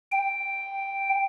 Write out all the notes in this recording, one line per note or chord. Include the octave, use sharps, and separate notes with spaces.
G5